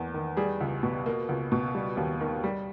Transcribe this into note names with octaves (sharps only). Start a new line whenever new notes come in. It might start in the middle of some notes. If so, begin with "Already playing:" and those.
Already playing: E2 A#3
D#3
G3 G#4
C#2
B2
A#3
C#2
B2
G3
D#2
D#3
G3